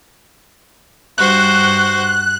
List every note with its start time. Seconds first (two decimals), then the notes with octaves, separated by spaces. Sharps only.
1.18 G2 F#4 C5 F#6